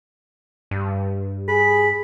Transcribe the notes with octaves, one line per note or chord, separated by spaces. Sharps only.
G2
G#4 B5